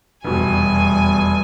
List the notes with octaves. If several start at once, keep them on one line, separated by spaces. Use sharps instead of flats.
F1 E2 B2 G3 G#5